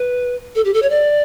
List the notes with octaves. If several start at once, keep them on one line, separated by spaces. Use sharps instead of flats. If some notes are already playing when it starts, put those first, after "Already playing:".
Already playing: B4
A4
G4
A4
C#5
D5